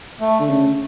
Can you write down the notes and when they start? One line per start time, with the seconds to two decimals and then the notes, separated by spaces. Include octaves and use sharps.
0.21 A3
0.40 D3
0.50 C#3